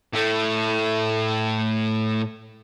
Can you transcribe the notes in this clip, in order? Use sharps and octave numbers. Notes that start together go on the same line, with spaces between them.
A2 A3